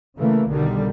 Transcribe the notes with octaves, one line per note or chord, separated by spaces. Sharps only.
C#3 E3 A3 A#3
B1 D3 D#3 G3